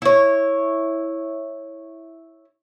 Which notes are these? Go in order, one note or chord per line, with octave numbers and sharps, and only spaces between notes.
E4 C#5